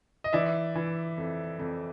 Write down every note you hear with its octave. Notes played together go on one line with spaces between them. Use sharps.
D#5
E3 D5 E5
E3
F2
F2